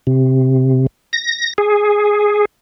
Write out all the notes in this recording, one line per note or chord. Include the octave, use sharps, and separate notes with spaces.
C3
A#6
G#4